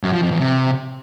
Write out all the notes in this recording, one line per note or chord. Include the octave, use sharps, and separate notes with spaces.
F#2
F3
F2
E2
C3